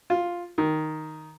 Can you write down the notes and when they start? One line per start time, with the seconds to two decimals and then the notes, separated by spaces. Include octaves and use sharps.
0.10 F4
0.58 D#3